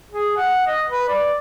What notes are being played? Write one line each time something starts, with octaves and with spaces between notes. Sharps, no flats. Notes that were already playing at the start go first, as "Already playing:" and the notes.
G#4
F#5
D#5
B4
D5